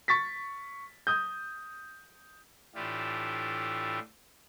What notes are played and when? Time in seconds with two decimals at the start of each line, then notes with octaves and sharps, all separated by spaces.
0.08 C#6 A6 B6
1.07 D#6 G6
2.75 A2 E3 D4 E4 F4 G4